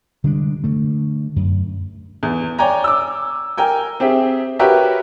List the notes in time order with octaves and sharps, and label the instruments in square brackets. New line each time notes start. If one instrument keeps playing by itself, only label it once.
[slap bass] D3 G3 G#3 D4
D3 A3
F#2
[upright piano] E2
C#5 D5 G5 G#5 A#5
D6 E6
A#4 G5 G#5
C4 G4 G#4 E5
F#4 G4 A#4 B4 C#5 E5